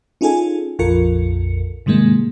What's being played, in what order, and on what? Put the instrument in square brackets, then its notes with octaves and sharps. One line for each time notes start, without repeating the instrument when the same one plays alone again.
[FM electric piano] C#4 D#4 F4 G#4 A4 G#5
A#1 F2 F4 A4 A#4 C#7
G#2 C3 D#3 G3 G#3 A#3